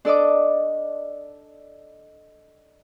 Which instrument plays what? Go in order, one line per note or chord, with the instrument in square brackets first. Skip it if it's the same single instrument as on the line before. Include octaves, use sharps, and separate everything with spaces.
[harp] D4 A4 D5 D#5 D6